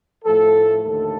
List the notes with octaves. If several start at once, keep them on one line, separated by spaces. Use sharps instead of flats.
A2 F3 A3 A4
D#2 D3 A3 A4